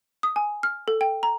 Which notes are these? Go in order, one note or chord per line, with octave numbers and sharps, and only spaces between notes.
D#6
G#5
F6
A4
G5
A#5